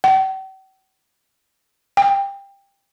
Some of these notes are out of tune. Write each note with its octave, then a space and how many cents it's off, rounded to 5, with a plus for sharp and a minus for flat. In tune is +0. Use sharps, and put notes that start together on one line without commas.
G5 -45
G5 +20